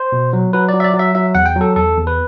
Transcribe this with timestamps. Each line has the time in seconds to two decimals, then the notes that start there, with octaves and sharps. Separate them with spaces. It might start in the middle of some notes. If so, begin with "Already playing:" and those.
Already playing: C5
0.12 B2
0.33 F#3
0.53 F#3 B4
0.69 D5
0.74 F#3
0.80 E5
0.84 D5
0.94 F#3
0.99 E5
1.15 F#3 E5
1.35 E2 F#5
1.46 G5
1.56 F#3 A4
1.76 E2 A4
1.97 E2
2.07 B4